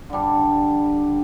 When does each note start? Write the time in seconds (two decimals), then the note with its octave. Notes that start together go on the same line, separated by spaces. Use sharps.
0.10 D3 G3 D4